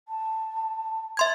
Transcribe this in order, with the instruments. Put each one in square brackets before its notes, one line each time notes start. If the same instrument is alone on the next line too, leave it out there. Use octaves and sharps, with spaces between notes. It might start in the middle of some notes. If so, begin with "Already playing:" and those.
[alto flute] A5
[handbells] E5 C6 G#6